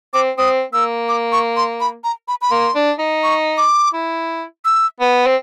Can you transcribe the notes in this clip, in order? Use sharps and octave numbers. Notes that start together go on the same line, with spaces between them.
C4 D6
C4 D#6
A#3 E6
D6
C#6
C6
B5
A#5
B5
B5
A#3 C6
D4
D#4
C#6
D6
E4
E6
B3
C4